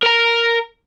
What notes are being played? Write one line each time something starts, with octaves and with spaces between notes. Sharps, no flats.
A#4 A#5